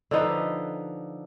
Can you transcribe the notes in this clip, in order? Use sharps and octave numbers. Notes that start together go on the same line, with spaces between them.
D3 F3 D#4 B4